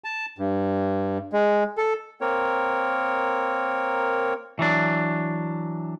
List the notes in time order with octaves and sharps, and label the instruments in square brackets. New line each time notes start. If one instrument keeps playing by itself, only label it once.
[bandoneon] A5
G2
G#3
A4
A#3 C4 A#4 C#5
[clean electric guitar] E3 F#3 D4